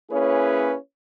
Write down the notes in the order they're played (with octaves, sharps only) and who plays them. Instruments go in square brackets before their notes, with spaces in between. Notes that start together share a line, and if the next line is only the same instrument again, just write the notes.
[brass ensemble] A#3 C#4 E4 G#4 B4 C#5